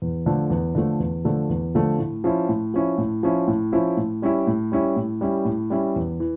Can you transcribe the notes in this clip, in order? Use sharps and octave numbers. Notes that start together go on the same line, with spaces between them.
E2
D3 F3 A3
E2
D3 F3 A3
E2
D3 F3 A3
E2
D3 F3 A3
A2
F3 C#4 E4
A2
F3 C#4 E4
A2
F3 C#4 E4
A2
F3 C#4 E4
A2
G3 C#4 E4
A2
G3 C#4 E4
A2
G3 C#4 E4
A2
G3 C#4 E4
E2
E3